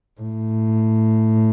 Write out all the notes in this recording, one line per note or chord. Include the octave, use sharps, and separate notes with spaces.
A2